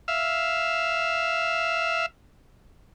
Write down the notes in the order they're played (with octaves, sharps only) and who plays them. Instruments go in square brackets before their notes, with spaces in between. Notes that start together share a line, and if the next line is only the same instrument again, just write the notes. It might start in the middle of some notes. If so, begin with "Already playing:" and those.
[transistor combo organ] E5 F5